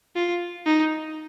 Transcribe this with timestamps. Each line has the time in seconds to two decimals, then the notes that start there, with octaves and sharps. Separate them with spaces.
0.15 F4
0.66 D#4